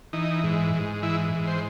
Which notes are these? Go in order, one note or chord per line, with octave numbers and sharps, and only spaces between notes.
E3 D#4
G#2
G#2
E3 E4
G#2
C5